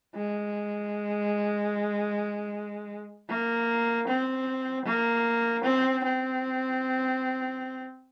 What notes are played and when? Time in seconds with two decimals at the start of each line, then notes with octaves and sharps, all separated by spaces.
0.15 G#3
3.29 A#3
4.08 C4
4.86 A#3
5.64 C4
6.04 C4